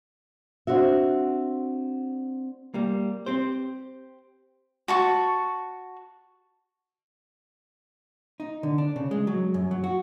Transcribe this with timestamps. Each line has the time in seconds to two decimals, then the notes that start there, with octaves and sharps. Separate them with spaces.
0.67 C4 D4 F#4 E5
2.74 G3 A#3
3.26 C4 G4 C5
4.88 F#4 A5 C#6
8.40 D#4
8.63 D3
8.78 D4
8.96 C#3
9.11 G#3
9.27 F#3
9.54 F#2
9.71 F#3
9.84 F#4